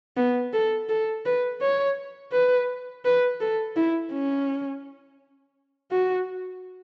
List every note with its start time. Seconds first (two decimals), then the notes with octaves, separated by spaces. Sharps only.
0.17 B3
0.53 A4
0.89 A4
1.25 B4
1.61 C#5
2.32 B4
3.05 B4
3.41 A4
3.76 E4
4.12 C#4
5.92 F#4